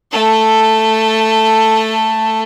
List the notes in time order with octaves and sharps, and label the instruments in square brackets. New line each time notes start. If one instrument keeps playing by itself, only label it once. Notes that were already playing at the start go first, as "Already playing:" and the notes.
[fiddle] A3 A4